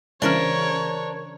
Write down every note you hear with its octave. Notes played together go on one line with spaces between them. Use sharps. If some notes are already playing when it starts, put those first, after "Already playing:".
C#3 E3 D4 A#4 C5 C#5 F6